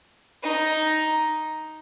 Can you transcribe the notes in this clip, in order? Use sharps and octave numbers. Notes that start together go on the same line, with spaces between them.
D#4